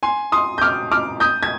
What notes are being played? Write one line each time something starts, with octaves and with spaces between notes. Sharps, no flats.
G#5 C6
C6 D#6
G6
D6 F6
D6 F6
D#6 G6
G#6